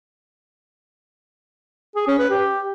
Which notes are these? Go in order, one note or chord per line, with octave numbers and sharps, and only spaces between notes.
G#4
C#4
B4
G4